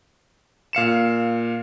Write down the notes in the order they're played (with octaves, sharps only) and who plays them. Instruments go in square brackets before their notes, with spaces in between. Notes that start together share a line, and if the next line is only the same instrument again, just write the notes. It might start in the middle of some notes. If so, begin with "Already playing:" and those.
[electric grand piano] A#2 F5 C#7 E7